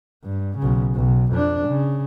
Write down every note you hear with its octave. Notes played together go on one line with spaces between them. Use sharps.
G2
B1 C#3
B1
F2 D4
C#3